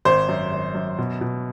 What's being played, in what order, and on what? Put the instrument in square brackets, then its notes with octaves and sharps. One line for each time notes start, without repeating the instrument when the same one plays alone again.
[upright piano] G#1 C5
F#2
G#1
F#2
B2
B2